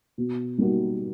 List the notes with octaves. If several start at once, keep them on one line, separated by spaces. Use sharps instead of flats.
B2
G3 A#3 D#4 F#4